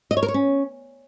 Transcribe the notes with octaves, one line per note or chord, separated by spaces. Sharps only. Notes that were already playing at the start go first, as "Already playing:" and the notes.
D#5
C#5
A#4
C#5
C#4